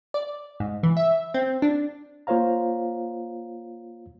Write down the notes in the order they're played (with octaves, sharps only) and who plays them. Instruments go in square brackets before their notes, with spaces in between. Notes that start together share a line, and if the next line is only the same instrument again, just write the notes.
[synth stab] D5
G#2
E3
E5
C4
D4
[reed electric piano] A#3 F4 C5 C#5 F5 A#5